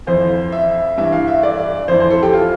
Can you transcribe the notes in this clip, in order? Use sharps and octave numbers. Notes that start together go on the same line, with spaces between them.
F2 E3 C5
E5
G2 E3 E5
F5
E5
D5
F2 E3 C5
C5
A4
G4
F4